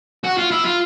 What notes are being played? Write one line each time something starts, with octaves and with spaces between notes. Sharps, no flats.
F#4
F4
E4
F4